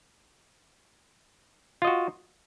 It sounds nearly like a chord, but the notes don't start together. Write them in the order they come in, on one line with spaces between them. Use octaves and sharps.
F4 D#5 F#4